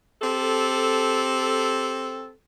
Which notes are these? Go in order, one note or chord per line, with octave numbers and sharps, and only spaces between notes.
C4 G4 A4